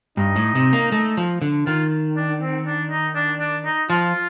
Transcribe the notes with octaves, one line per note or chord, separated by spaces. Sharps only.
G2 D#4
A2
C3
A#3
A3
F3
D3
D#3 F4
D4
C4
D4
D#4
D4
D4
D#4
F3 F4